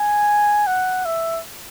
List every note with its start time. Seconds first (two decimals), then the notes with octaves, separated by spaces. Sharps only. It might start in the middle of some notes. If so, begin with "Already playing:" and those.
Already playing: G#5
0.67 F#5
1.05 E5